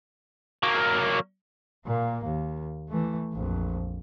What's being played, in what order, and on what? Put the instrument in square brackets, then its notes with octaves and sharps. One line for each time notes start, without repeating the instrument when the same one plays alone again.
[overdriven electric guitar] F#3 A#3
[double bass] A#2 A#3
D#2
E3 A3
A#1 F2